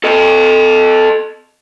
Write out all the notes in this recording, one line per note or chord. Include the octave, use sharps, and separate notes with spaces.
A4 D#5